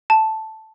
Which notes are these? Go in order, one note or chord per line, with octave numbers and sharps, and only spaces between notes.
A5